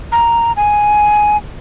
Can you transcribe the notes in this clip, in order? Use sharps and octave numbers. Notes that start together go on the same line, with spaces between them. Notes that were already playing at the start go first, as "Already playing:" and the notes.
A#5
G#5